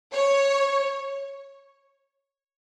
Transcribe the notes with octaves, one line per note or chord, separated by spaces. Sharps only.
C#5